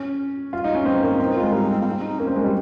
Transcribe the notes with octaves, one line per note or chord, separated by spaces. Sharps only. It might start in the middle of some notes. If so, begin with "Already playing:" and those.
Already playing: C#4
F4
D#4
C#4
C4 D#4
A#3 D#4
C4 D#4
A#3
F4
G#3
G3 D#4
C4
A#3
C4
D#4
A#3 C#4
C4
G#3
G3